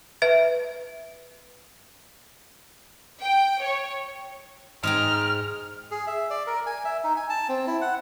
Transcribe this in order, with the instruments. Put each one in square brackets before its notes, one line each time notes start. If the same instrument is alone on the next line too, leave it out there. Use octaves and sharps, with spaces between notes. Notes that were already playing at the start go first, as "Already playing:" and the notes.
[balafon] B4 E5
[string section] G5
C#5
[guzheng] G#2 D#4 G5 [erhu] F6
[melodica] G#4
E5
D5
A#4
G#5
E5
D#4
G#5
A5
C4
E4
F#5